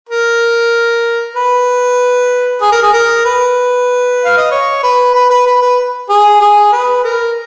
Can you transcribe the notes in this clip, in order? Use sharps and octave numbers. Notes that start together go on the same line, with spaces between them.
A#4
B4
G#4
A#4
G#4
A#4
B4
F5
D#5
C#5
B4
B4
B4
B4
B4
G#4
G#4
B4
A#4